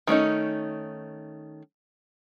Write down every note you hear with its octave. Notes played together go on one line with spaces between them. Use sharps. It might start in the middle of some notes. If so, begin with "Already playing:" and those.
D#3 A3 C#4 D#4